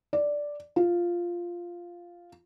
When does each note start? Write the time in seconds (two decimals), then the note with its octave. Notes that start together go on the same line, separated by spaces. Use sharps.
0.13 D5
0.76 F4